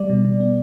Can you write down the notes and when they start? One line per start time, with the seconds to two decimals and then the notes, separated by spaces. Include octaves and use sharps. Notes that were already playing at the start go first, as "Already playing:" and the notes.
Already playing: G3 D5
0.10 B2
0.25 B2
0.40 B3